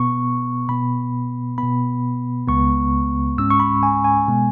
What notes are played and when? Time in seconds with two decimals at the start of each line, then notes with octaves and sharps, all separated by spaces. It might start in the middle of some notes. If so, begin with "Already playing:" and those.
Already playing: B2 B3 C#6
0.69 B2 B3 B5
1.58 B2 B3 B5
2.47 C#2 C#3 G#3 B3 C#6
3.37 G#2 G#3 C#4 E6
3.50 C#6
3.60 B5
3.83 G#5
4.05 G#5
4.28 B2 G#3 B3